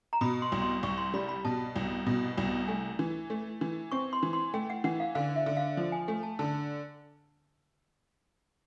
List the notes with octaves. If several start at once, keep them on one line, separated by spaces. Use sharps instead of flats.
A#5
B2 B5
C6
C2
C6
C2 C#6
C6
G3 B5
B5
B2 A5
C2
B2
C2
A3 G#5
E3
A3
E3
C4 C#6
C6
E3
C6
A3 G5
F#5
E3 F#5
F5
D3 F5
E5
D3
F5
F3
G#5
A3 G#5
A5
D3 A5